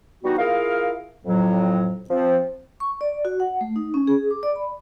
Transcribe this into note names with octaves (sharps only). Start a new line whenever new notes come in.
E3 G3 B3 D#4 F#4
E4 F4 G#4 A#4 F5
F2 A2 F#3
F3 C4
C#6
D5
F#4
F#5
A3
D#4
C#4
G#4
D6
D5
B5